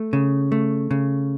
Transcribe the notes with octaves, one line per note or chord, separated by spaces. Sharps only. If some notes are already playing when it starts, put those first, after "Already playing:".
Already playing: A3
C#3
A3
C#3